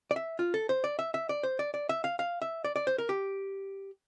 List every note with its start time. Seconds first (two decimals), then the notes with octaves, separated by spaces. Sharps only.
0.11 D5
0.16 E5
0.39 F4
0.54 A4
0.69 C5
0.84 D5
0.99 E5
1.14 E5
1.29 D5
1.43 C5
1.59 D5
1.74 D5
1.89 E5
2.04 F5
2.19 F5
2.42 E5
2.64 D5
2.76 D5
2.87 C5
2.98 A#4
3.09 G4